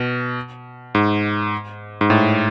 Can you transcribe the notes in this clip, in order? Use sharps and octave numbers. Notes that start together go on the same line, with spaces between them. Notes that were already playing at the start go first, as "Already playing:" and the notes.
Already playing: B2
G#2
G#2
A2